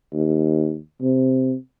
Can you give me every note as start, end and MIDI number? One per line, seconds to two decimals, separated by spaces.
0.14 0.77 39
1.01 1.55 48